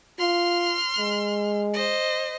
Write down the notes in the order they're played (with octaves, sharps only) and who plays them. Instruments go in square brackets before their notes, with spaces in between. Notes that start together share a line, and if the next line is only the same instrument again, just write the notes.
[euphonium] F4 [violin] C6 F6
[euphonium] G#3
[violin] C5 D#5